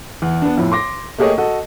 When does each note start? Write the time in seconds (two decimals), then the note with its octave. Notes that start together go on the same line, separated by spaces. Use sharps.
0.22 E2
0.42 B3 D4
0.58 F2 A2
0.72 C6 D6 A#6
1.18 A3 A#3 G4 G#4 C#5 D#5
1.38 F#4 A4 D#5